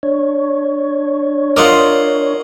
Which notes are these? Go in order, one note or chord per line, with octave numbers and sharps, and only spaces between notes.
D4 C#5
F4 A#4 D#5 F#5 C6 D6